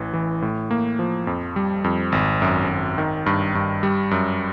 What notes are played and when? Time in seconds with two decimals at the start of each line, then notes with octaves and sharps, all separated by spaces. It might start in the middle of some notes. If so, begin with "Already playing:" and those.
Already playing: A1 E3
0.13 E3
0.42 A2
0.71 A#3
0.99 F3
1.27 F2
1.56 G3
1.84 F2
2.12 G#1
2.42 F#2
2.69 G#1
2.98 D#3
3.26 G2
3.55 G2
3.83 G3
4.11 F#2